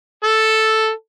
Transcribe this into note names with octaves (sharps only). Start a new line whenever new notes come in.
A4